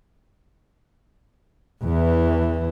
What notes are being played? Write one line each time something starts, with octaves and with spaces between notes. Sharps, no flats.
E2 E3